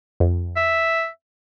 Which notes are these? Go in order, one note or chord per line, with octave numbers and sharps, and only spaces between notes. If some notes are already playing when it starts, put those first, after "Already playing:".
F2
E5